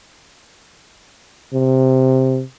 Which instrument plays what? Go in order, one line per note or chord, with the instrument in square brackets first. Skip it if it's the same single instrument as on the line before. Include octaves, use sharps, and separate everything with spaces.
[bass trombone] C3